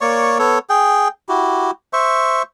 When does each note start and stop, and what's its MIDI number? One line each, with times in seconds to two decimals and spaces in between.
0.01 0.38 58
0.01 0.38 73
0.01 0.38 74
0.01 0.38 85
0.39 0.59 59
0.39 0.59 69
0.39 0.59 73
0.70 1.08 68
0.70 1.08 79
1.29 1.71 64
1.29 1.71 66
1.29 1.71 67
1.93 2.43 72
1.93 2.43 76
1.93 2.43 85